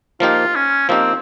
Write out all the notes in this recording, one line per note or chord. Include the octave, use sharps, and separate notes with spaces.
F3 A#3 D#4 F4 G4
C#4
F3 A#3 C4 D#4 G4